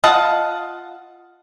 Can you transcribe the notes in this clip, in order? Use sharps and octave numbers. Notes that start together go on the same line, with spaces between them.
F4 D#5 F#5 A5